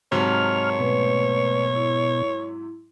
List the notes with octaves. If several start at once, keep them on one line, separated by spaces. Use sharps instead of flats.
G#2 C3 F#3 C#5 A5 A#5 F6
B2 A3 B4
E4